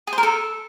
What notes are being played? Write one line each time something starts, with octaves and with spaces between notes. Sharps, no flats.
G#4
C5
A#4
A4